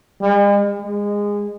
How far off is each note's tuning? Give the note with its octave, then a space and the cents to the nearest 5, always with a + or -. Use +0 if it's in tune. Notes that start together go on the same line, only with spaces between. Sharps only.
G#3 -45
G#3 -20